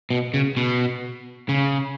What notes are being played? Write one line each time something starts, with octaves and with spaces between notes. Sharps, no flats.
B2
C#3
B2
C#3